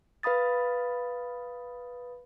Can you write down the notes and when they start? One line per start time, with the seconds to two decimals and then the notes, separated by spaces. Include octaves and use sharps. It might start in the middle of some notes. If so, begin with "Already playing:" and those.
0.23 B4 F5 B5 D#6 A6